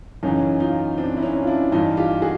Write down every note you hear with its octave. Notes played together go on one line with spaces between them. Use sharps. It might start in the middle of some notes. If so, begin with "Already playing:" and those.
F#2 C#3 E3 C#4 D#4
D#4 F4
C4 D4
E4
C#4 D#4
F4
D4 E4
G2 E3 D#4 F4
F4 G4
F#4 G#4